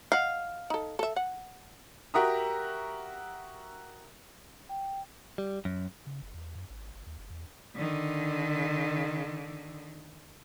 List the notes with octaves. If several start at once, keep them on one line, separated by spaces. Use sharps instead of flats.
D#5 F5 F#5
D#4 A4
A4 E5
F#5
F#4 G4 A#4 E5 A#5 D#6
G5
G3
F#2
C#3
F#1
E2
F#2
G#1
G1
D#2
F#1
E2
D3 D#3